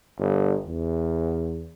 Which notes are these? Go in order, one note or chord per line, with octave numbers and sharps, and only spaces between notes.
G1
E2